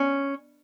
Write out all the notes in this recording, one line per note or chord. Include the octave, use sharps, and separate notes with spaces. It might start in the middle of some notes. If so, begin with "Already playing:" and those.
Already playing: C#4